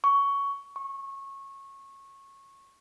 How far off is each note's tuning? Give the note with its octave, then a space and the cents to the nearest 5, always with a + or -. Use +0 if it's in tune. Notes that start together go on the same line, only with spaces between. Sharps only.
C#6 +15
C#6 -20